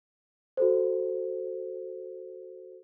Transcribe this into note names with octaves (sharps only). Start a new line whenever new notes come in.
F#4 A4 C5